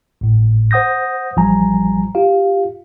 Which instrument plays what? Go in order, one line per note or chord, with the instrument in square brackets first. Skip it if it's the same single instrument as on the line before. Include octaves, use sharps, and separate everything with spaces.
[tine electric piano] G#1 A2
C5 F#5 D#6 G6 A#6
A1 F3 G3 G#5 A#5
F4 G4 F5